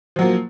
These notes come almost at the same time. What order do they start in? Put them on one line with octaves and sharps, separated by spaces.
F3 F#3 A#3